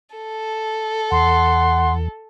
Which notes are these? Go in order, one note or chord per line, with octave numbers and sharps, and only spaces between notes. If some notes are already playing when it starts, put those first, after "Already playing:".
A4
E2 F#5 C6